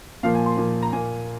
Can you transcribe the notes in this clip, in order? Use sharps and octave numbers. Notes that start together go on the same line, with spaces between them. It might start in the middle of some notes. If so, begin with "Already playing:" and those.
A#2 F3 A#3 F5
G#5
C6
A#2 F3 A#3
A#5
A#2 A#3 G#5